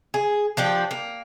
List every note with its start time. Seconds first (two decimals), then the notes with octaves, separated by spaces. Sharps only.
0.14 G#4
0.57 F3 D4 G4
0.91 A#3